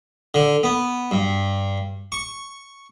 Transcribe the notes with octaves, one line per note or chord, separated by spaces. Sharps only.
D3
B3
G2
C#6